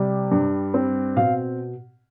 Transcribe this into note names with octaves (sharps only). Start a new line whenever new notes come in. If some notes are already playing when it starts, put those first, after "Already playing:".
Already playing: C3 G3
G2
C4
B2 F5